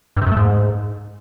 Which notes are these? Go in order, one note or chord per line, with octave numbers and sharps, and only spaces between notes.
G2
C3
F#2
A3
G#2